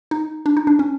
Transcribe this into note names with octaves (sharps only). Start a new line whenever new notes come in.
D#4
D4
D#4
D4
C#4